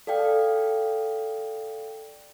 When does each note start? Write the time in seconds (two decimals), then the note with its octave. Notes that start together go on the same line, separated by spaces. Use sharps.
0.07 A4 D5 F5 G5